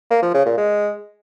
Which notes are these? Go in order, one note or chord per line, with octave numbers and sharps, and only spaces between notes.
A#3
F3
C#3
A#2
G#3